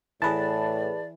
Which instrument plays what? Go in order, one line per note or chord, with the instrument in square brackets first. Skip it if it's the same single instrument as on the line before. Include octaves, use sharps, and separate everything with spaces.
[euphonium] A2 [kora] E3 [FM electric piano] G#4 B4 A5 [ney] D5